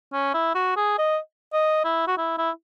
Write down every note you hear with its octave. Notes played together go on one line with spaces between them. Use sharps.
C#4
E4
F#4
G#4
D#5
D#5
E4
F#4
E4
E4